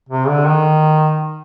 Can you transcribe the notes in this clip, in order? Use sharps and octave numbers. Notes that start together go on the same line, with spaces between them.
C3
D3
D#3